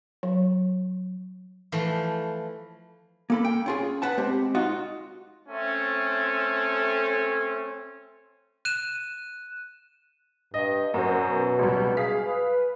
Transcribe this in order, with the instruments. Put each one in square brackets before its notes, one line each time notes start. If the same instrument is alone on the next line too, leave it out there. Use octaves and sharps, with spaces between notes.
[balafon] F#3
[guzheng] E3 F3 A3
[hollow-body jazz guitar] A#3 A4 B5
G5
C#4 F4 G#4
B4 F#5 A5
G#3 C4 G4
D#4 F4 F#4
[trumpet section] A3 C4 C#4 A4
[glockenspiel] F#6 D#7 E7
[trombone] G2 [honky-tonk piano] D#5
[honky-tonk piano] F#2 C5 [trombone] F#4
[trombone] B2
[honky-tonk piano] C#2 F#3 G3
[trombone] G#4 [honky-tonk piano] F5 B6
[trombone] B4